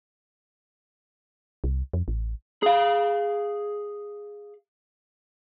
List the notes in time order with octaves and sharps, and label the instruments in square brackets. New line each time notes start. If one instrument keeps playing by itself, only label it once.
[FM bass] C2
F2
A1
[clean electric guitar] G#4 F5